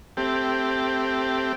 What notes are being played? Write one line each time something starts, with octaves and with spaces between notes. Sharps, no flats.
A3 C4 G4